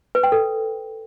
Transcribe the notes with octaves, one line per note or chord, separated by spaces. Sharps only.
B4
G5
A4